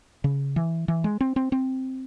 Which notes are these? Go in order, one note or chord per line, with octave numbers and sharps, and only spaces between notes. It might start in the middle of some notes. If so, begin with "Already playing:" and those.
C#3
E3
E3
G#3
C4
C4
C4